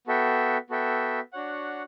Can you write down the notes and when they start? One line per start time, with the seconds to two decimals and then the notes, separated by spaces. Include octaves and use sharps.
0.07 B3 F#4 A4 E5 G5
0.70 B3 F#4 A4 E5 G5
1.33 D4 F#4 C#5 F#5